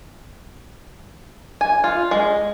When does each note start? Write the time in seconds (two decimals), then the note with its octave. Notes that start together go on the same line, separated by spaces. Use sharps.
1.61 G#5
1.84 F4
2.11 G#3